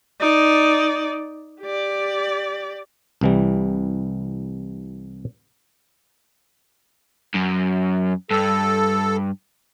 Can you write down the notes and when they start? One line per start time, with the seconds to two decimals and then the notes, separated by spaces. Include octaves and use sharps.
0.20 D#4 D5
1.61 G4 D5
3.21 C2 E3 G3
7.35 F#2
8.31 G2 A4